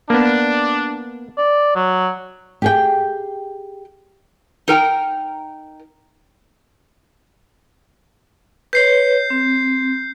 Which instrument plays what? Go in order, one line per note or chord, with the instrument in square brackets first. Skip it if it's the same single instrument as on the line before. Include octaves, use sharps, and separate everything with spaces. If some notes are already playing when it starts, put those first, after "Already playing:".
[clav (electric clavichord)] A#3 B3 [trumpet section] D4
[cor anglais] D5
F#3
[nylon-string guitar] G4 G#4 G5
[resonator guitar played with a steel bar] D#4 A#4 G5
[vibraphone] B4 C#5 [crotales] G6 C7
[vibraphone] C4